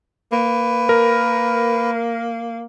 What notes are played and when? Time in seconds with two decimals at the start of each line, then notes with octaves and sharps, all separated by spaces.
0.32 A#3 B4
0.89 A#4